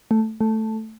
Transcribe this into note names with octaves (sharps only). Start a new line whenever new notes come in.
A3
A3